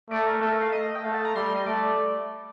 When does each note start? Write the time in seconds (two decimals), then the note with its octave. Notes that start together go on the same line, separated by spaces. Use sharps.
0.10 A3 D5
0.26 A#4
0.41 A3 A4
0.52 A#4
0.62 F5
0.72 D#5
0.96 G5
1.04 A3 F5
1.14 A5
1.25 A#5
1.35 G3 C6
1.46 C6
1.56 D#5
1.66 A3 D5